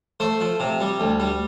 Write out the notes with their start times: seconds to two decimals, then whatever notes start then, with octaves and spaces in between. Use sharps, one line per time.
0.20 A3 C5
0.40 F3
0.60 C3
0.81 G3
1.00 D2
1.20 G3